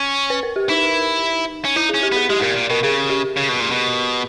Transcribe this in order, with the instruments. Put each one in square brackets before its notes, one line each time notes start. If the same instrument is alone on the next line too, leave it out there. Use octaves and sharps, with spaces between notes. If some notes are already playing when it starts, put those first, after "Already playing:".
Already playing: [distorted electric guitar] C#4
[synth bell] B4
A#4
G4
[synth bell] D#4 [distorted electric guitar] E4
[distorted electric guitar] C#4
[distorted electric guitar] D#4 [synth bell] E4
[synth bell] G#4
[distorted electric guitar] C#4
[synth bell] G4
[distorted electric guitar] B3 [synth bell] G#4
[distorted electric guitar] G#3 [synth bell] G4
[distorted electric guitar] G#2
[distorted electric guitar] A#2 [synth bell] A#4
[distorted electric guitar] A#2
[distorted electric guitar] B2 [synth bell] A#4
[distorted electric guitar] C#3 [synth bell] G#4
[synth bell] G4
[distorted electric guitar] C#3
B2
A#2
B2